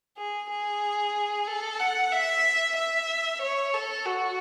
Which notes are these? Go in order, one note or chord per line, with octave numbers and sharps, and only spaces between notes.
G#4
G#4
A4
F#5
E5
E5
C#5
A4
F#4